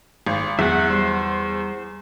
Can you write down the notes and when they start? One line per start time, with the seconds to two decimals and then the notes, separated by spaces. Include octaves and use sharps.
0.27 G#1
0.59 E2 F#3 E5 F#5
0.90 G3 C5